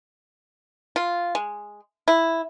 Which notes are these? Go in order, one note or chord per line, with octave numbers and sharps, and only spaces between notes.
F4
G#3
E4